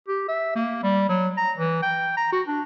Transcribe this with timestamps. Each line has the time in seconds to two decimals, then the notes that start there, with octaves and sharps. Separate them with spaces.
0.08 G4
0.28 E5
0.55 A#3
0.83 G3
1.09 F#3
1.37 A#5
1.57 E3
1.82 G5
2.17 A#5
2.32 F#4
2.47 D4